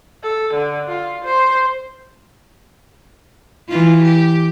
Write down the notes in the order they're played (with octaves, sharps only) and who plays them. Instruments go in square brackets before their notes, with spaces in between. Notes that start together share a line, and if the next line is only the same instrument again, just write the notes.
[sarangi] A4
D3
F4
C5
[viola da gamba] E3 F4
G4